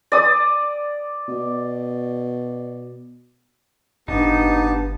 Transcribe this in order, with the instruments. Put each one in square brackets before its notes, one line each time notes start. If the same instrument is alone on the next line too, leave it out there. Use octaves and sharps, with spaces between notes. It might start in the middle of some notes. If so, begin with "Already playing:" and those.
[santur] D5 D#6
[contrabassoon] B2
[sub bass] G1 [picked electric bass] A2 D4 [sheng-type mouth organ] B3 G4 A5 [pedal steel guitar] D#4